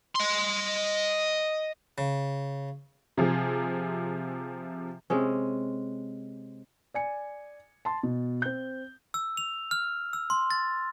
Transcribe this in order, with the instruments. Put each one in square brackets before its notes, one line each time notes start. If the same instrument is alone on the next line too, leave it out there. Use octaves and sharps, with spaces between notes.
[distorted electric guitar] D#5 C6
[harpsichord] C#3
[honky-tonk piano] C3 F3 G#4
[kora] C3 G#3 C#4
[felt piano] D5 G#5 C#7
A5 C6
B2
C4 G6
[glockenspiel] E6
F7
F6
E6
C6
A6